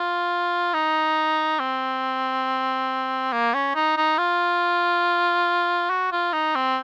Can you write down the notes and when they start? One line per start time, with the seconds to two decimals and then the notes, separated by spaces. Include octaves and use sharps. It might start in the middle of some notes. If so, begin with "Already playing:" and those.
Already playing: F4
0.74 D#4
1.60 C4
3.32 A#3
3.54 C#4
3.75 D#4
3.97 D#4
4.18 F4
5.90 F#4
6.12 F4
6.33 D#4
6.55 C4